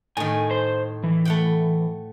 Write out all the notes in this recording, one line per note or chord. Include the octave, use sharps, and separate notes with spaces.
A2 D#3 G#5
C5
E3
A3 F#5 G5